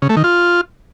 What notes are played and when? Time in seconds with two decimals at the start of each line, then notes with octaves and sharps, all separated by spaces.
0.02 C#3
0.09 A3
0.17 D#3
0.24 F4